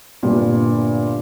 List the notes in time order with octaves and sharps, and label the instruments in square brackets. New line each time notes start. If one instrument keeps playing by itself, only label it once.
[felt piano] G1 A#2 G3